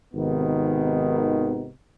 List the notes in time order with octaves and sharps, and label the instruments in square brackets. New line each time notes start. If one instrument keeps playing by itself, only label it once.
[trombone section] G#1 C3 D#3 B3 D#4